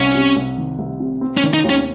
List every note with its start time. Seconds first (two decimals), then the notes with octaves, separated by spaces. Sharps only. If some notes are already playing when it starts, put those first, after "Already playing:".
Already playing: C2 C#4
0.15 C3
0.36 C2
0.58 D#3
0.79 C2
1.00 C3
1.21 C4
1.37 C#4
1.44 D#3
1.54 D#4
1.64 D#2
1.69 C#4